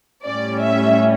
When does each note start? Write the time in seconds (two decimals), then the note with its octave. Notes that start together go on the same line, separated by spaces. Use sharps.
0.25 A2 G3 C#4 D5
0.62 E5